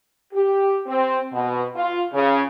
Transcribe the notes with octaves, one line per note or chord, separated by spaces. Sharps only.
G4
C4
B2
F4
C#3